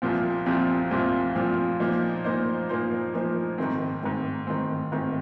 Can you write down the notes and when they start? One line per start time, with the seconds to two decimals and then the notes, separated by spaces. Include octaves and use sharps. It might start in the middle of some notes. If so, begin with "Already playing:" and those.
0.02 C2 A#2 F3 C4 F4
0.46 C2 A#2 F3 C4 F4
0.91 C2 A#2 F3 C4 F4
1.35 C2 A#2 F3 C4 F4
1.80 A#2 F3 A#3 D#4 C5
2.24 A#2 F3 A#3 D#4 C5
2.69 A#2 F3 A#3 D#4 C5
3.14 A#2 F3 A#3 D#4 C5
3.58 G#2 D#3 C4
4.03 G#2 D#3 C4
4.47 G#2 D#3 C4
4.92 G#2 D#3 C4